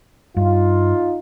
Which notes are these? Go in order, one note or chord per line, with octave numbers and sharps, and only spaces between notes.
G2 D#4 F4